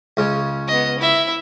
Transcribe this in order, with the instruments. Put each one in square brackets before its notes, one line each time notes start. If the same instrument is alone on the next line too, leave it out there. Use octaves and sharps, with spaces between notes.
[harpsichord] C#2 C#3
[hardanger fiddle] B3 D#5
E4 E5